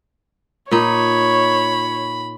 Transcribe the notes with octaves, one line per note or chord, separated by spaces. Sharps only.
A#2 D#4 C#5 B5